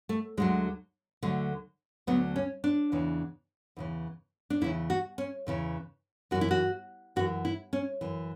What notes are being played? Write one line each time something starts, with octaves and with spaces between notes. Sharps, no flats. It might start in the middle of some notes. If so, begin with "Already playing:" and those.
A3
D2 D3 F#3 G#3
D2 D3 F#3 A3
D2 D3 F#3 B3
C#4
D4
E2 C#3 E3
E2 C#3 E3
D4
E2 C#3 E3 E4
F#4
C#4
E2 C#3 E3
F#2 E3 F#4
E4
F#4
F#2 E3 F#4
E4
C#4
F#2 E3